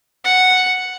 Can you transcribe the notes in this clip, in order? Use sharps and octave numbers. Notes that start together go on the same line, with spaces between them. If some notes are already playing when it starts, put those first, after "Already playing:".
F#5